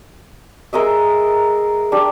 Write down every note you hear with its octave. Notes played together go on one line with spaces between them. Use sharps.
G#3 A#4 D#5 E5
D4 G4